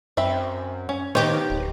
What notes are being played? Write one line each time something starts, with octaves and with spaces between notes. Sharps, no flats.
F#2 C4 E5 B5
C#4
D#3 B3 D#4 G4 C5 C#5
D1